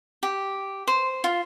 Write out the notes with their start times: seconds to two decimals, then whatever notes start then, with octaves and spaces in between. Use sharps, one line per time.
0.23 G4
0.87 C5
1.24 F4